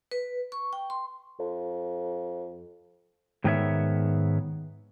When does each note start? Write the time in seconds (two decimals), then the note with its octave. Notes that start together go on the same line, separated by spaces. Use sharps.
0.12 B4
0.52 C#6
0.73 G5
0.90 C6
1.39 F2
3.44 G#2 D#3 B3 G4 C#5 E5